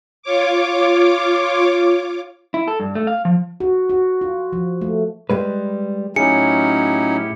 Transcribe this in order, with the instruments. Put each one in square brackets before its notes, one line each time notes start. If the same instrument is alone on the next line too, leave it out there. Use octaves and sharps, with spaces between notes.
[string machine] F4 C#5 D6
[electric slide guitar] E4
A4
G2
A3
F5
F3
[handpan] F#4
F#4
F4
F3
A3
[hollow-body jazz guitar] G3 G#3 B4
[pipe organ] A2 E4 G4 [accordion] F#3 C#4 D#4 [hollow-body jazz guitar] G#4 [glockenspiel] C#7